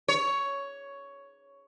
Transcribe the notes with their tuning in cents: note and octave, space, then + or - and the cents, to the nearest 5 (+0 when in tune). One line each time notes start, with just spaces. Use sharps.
C#5 +10